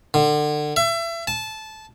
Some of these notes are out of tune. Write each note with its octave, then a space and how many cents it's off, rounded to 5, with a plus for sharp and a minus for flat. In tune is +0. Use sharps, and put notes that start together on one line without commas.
D3 +30
E5 +30
A5 -15